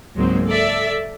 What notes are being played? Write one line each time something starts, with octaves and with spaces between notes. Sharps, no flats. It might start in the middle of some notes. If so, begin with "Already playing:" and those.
C#2 G#2 F#3 G#3 A#3 C4
A4 D5 E5